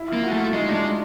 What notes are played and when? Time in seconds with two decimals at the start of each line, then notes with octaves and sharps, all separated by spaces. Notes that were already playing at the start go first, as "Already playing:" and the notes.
Already playing: E4
0.08 A#3 F4
0.23 G#3 F#4
0.33 A3
0.38 F4
0.53 G#3 D#4
0.68 A3 D4
0.73 G#3
0.84 D4